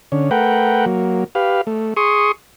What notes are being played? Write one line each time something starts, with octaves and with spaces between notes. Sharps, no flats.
D3 C#4
A3 A#4 B4 F#5 G5
F#3 A#3
G4 B4 F5
A3
G#4 C6 C#6 D#6